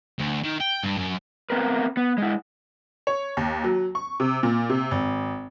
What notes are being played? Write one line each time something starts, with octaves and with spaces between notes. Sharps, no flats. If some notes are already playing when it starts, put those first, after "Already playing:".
D2
D#3
G5
G2
F#2
B3 C4 A#4 B4
B3
G#3 E4
C#5
D#2
F#3
C#6
C3
A#2
C3
G#1